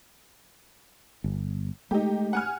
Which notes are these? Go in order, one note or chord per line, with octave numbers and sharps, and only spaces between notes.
G1
G#3 A3 D#4 G4
F#5 G#5 F6